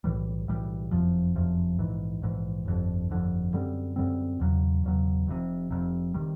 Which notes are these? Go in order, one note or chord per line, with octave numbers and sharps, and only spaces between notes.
B1 A2 E3 G3
B1 A2 E3 G3
F#1 F2 C3 F3
F#1 F2 C3 F3
A#1 G#2 E3
A#1 G#2 E3
G1 F2 D3
G1 F2 D3
F#2 D3 G3 C4
F#2 D3 G3 C4
E1 E2 C#3 F#3
E1 E2 C#3 F#3
F1 F2 C3
F1 F2 C3
C3 D#3 G3